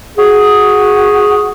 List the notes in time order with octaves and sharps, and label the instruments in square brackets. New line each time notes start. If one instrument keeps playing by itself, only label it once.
[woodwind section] F#4 G#4